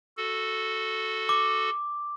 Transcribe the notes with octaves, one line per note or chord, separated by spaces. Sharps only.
F#4 A4
D6